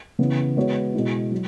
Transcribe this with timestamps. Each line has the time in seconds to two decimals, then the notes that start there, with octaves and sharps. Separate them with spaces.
0.19 C#3 E3 B3 E4
0.56 G#3 B3 F#4 C#5
0.94 B2 G#3 E4
1.31 F#3